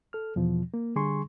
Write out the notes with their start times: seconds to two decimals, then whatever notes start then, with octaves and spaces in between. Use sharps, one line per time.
0.13 A4 F6
0.36 E2 B2 F3
0.74 A#3
0.96 D3 G3 G#4 G#5 C6 C#6